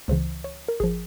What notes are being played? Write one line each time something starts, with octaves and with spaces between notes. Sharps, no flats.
C#2 C#3 E3 C5
C#5
A#4
G#1 F3 G#4